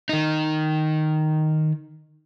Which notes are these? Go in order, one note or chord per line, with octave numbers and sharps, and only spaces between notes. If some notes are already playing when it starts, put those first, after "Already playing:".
D#3 D#4